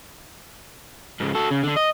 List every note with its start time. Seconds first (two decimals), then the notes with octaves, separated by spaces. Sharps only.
1.20 G#2 C#3
1.35 F#4 A4
1.51 C#3
1.64 D3 D4
1.77 D#5